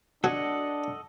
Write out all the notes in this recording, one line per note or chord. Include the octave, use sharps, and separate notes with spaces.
D4 F#4 A4 C#5 D#5 F#5